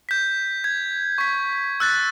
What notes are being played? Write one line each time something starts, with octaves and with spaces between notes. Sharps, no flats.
G6 B6
G#6
C#6 B6
E6 F#6 A6